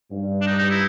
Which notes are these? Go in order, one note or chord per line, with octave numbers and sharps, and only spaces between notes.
G2
D4
D#4
D#4
E4